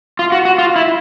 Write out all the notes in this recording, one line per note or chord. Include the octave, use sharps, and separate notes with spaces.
F4
F#4
F#4
F4
E4